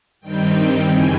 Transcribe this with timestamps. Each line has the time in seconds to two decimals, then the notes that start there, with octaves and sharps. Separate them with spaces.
0.20 G2 D#3 G3 C4 D#4 G5
0.82 F#2 C#3 E3 G3 C4 G#5